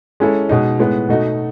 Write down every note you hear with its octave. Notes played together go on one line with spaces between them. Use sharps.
G#3 C#4 E4 A4
B2 G#3 D#4
A2 G#3 B3
B2 A3 D#4 F#4